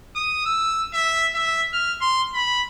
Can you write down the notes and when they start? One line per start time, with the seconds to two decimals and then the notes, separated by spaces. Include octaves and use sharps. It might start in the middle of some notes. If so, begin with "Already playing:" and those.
0.16 D#6
0.46 E6
0.93 E5
1.35 E5
1.73 F6
2.02 C6
2.34 B5